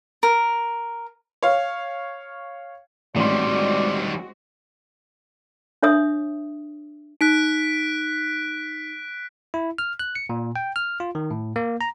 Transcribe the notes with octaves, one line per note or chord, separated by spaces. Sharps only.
A#4
C#5 F5
A1 D#3 G3 G#3 C4 F#4 D5 C6
D4 C#5 E5 D#6
D#4 F#6 B6 D7
E4
F6
F#6
C#7
A#2
G5
F6
F4
D#3
A2
A#3
A#5